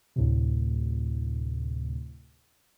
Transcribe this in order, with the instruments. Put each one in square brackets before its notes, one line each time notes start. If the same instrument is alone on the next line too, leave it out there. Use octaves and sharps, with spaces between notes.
[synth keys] D2 A2 C3